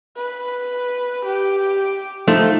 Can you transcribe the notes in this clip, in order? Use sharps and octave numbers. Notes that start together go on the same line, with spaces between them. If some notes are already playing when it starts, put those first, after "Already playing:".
B4
G4
F3 A3 D#4